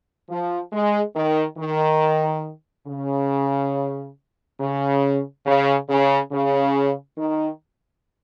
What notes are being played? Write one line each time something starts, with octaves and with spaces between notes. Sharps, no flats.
F3
G#3
D#3
D#3
C#3
C#3
C#3
C#3
C#3
D#3